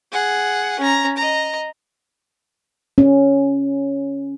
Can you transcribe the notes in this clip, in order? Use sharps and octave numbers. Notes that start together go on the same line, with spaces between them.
G#4 F#5
C#4 A#5
D#5 A#5
C#4